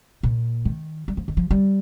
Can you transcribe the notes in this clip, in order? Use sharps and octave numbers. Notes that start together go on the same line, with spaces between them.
A#2
D#3
G3
F3
D#3
F3
G3